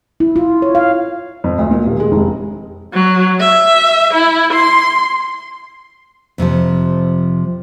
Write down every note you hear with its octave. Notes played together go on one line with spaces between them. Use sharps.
E4
F4
C#5
F5
F2
D2
A#2
D#1
G#3
F1
F#3
E5
E4
C6
F2 C3 E3 F3